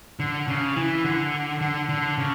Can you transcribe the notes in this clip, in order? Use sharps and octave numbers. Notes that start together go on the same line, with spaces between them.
D3
C#3
E3
D3
D3
D3
C#3